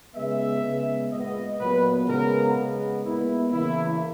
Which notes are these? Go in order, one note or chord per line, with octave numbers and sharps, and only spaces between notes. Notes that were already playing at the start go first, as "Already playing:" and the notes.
C#3 G#3 B3 E5
C#3 G#3 B3
A#2 G#3 B3 D#5
A#2 F#3 B3 B4
C#3 G#3 B3 A#4
C#3 G#3 B3
A#2 G#3 B3 E4
C#3 E3 A#3 E4